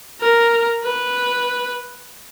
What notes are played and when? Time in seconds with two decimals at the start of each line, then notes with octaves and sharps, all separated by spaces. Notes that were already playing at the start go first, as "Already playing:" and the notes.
0.21 A#4
0.83 B4